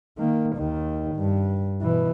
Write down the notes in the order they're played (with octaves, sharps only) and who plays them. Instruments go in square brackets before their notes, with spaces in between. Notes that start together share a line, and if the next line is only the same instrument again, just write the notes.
[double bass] D#3 A#3
D#2 D#3
G2
B2 E3